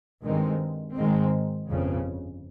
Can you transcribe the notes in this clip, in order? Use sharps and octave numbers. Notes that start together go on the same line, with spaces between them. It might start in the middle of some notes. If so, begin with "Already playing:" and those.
G2 D#3 G#3 C4
G#2 D#3 G#3 C4
G1 F2 C#3